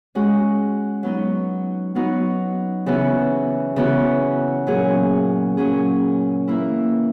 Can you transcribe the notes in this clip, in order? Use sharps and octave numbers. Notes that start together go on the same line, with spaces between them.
G#3 C#4 F#4
F#3 B3 D#4 F#4
F#3 B3 D#4 F#4
C#3 E3 B3 F#4
C#3 E3 B3 F#4
A#2 F#3 C#4 G#4
A#2 F#3 C#4 G#4
E3 A#3 E4